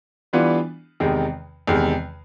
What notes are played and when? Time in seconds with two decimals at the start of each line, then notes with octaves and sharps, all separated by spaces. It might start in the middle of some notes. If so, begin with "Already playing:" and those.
0.33 E3 G3 B3 D4 F4
1.00 E2 C3 D#3 G#3
1.67 E2 C3 D#3 G#3